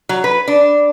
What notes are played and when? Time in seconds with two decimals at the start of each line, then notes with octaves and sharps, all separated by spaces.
0.09 F#3
0.24 B4
0.48 D4